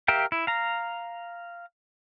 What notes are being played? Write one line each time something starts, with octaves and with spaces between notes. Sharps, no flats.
G4 A#4 E5 F5 G5
E4
F5 A#5